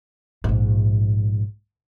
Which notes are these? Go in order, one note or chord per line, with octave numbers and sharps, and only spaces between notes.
A#1 G#2